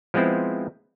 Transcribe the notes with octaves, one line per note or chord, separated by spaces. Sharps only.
F3 G#3 B3 C4 E4